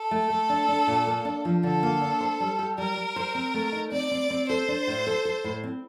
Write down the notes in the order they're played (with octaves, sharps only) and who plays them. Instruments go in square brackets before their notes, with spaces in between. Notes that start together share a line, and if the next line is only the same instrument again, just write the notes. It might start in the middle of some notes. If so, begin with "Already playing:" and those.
Already playing: [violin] A4
[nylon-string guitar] A3
A3
D4
D4
A#2
A#3
D4
F3
[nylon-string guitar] D3 [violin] A4
[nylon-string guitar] A#3
D4
C5
G3
G4
[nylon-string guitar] G3 [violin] A#4
[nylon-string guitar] G3
C5
C4
A3
D#4
[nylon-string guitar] C4 [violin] D5
[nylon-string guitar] C4
C4
[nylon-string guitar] A4 [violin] C5
[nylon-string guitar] D4
A2
A4
A4
A2
C4